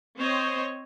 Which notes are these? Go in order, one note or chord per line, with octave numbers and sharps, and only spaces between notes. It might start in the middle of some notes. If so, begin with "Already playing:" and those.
C4 C5 C#5 D#5